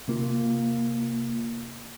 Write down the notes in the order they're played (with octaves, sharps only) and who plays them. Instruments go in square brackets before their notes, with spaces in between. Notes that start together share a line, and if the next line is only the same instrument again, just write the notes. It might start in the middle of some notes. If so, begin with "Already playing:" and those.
[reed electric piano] C3 A#3 F4